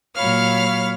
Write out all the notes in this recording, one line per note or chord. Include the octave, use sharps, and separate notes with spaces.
A#2 F#3 C#5 F5 B5 F6